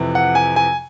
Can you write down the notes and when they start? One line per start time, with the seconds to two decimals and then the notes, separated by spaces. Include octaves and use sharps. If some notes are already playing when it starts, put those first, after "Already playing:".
Already playing: F2 C3 E3
0.15 F#5
0.35 G#5
0.56 G#5